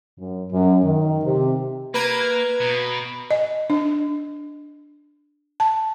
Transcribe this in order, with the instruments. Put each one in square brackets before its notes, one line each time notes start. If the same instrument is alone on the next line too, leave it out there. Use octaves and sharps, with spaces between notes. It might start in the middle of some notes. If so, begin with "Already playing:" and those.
[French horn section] F#2
F#2
D#3
C3
[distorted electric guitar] A#3 [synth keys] B4 A#5 G#6
[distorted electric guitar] B2
[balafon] D#5
D4
A5